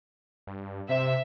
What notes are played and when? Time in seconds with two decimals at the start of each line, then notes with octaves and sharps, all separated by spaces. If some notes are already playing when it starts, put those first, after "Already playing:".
0.47 G2
0.89 C3 C5 E5